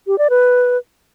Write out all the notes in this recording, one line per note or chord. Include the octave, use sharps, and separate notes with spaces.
G4
D5
B4